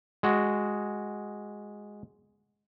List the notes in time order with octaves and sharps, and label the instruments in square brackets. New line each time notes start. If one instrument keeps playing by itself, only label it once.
[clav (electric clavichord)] G#3 F#4